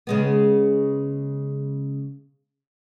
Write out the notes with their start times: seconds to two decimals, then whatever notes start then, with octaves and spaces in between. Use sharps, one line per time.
0.07 C#3 G#3 B3